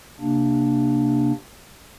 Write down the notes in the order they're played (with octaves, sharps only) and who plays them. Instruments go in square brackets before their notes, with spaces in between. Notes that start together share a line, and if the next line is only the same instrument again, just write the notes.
[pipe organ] C3 A#3 D4